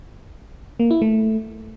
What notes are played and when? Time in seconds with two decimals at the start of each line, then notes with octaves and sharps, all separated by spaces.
0.80 A#3
0.91 E4
1.02 A3